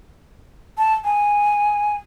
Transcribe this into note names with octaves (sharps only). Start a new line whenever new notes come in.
A5
G#5